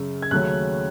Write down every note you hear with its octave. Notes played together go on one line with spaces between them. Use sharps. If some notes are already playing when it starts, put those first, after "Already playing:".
Already playing: F#2 C#3
G#6
D#2 C#3 F#3 A3 C#4 F#6